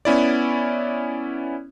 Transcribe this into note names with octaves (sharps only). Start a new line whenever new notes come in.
B3 C#4 E4 D5